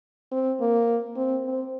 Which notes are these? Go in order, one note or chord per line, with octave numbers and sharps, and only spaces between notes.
C4
A#3
C4
C4